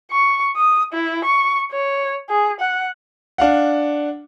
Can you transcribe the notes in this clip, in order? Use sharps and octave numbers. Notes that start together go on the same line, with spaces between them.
C#6
D#6
E4
C#6
C#5
G#4
F#5
D4 F5 F#5